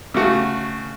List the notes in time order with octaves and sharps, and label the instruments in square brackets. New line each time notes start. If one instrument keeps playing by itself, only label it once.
[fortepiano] C#3 A3 F#4